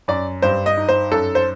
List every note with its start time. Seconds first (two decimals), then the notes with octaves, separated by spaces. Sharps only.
0.08 F#2 D5
0.42 G2 C5
0.66 D#5
0.77 D#4
0.89 C5
1.12 F#2 A4
1.35 C5